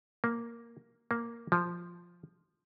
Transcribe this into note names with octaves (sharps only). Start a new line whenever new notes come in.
A#3
A#3
F3